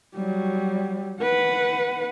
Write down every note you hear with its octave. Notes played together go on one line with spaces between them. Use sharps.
F#3 G3
B4 F#5